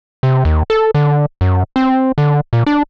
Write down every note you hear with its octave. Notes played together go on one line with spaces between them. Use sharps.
C3
D#2
A4
D3
F#2
C4
D3
A#2
D4